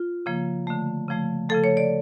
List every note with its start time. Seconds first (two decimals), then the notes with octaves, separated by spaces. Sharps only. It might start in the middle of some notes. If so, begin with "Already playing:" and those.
Already playing: F4
0.26 C#3 F3 A#3
0.67 D3 A3
1.08 C#3 F3 A3
1.49 C#3 F3 A3 A4
1.64 C#5
1.77 D5